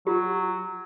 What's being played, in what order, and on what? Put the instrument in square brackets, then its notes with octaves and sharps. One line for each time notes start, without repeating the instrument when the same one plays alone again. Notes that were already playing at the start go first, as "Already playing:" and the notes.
[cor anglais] F#3 [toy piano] F4 G4